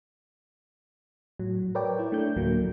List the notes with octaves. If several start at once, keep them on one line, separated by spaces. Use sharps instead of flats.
A2 F#3
A#4 B4 C#5 D5 G5
E4
A3 D4 G6
D2 A2 F#3 A3 A#3